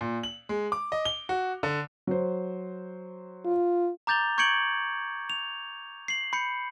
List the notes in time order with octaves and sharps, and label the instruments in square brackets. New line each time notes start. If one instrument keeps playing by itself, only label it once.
[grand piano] A#2
F#7
G#3
D6
D#5
G7
F#4
D3
[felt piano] F#3 C5
[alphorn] F4
[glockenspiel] A#5 D6 G6 A6 F7 G7
C#6 G6 G#6 C#7 D7 F#7
F7
C7 F#7
B5 G6 C#7